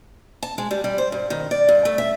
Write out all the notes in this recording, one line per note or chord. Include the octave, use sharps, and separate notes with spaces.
A5
G#3
G3
G3
C5
G2
D#3
D5
G2
A3
E5